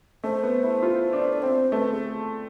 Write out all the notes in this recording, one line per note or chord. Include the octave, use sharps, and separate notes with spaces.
A3 C5
B3
E4
F4
D4
D5
C4 C5
A3 B4
G#4